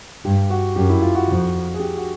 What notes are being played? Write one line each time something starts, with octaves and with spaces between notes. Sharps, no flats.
G2 G4
F#4
F#2 G4
E4
F4
F#4
F2
G#4
G4
F#4